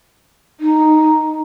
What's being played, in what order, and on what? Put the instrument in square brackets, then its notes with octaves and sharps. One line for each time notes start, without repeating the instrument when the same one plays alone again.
[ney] D#4